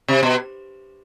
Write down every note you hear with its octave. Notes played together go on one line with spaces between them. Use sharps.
C3
B2